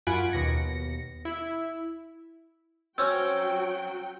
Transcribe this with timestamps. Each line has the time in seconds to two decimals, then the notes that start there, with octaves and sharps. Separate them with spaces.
0.07 F#2 F4 F#5 G#5 B5 D7
0.32 D#2 B2 A#6 C#7
1.25 E4
2.98 F#3 C4 C#4 F#4 G5 E6 F6